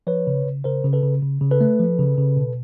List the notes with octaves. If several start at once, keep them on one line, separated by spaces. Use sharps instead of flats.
F3 B4 C#5
C#3
C#3
C#3 A#4 C5
C#3
A4 B4
C#3
C#3
C#3
A4 B4
A3
F3
C#3
C#3
B2